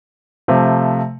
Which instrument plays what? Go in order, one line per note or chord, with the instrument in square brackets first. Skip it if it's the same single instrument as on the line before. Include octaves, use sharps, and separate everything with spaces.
[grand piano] C3 F3 A3